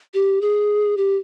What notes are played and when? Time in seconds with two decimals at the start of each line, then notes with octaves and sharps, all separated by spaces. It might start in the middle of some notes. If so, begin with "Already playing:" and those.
0.14 G4
0.41 G#4
0.97 G4